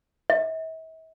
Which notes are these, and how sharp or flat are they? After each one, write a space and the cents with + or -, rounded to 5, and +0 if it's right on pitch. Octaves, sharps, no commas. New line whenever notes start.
E5 -45